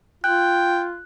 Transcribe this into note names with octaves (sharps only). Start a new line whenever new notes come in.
F4 G5 F#6